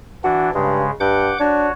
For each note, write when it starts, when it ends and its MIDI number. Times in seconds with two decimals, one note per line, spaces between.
0.24 0.51 52
0.24 0.51 62
0.24 0.49 66
0.54 0.85 43
0.54 0.91 49
0.54 0.91 56
1.00 1.33 43
1.00 1.38 78
1.00 1.38 86
1.00 1.38 91
1.40 1.69 62
1.40 1.72 66
1.40 1.72 73